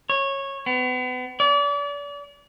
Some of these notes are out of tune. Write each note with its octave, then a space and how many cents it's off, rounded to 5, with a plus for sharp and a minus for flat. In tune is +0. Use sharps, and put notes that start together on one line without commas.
C#5 -15
B3 +35
D5 -35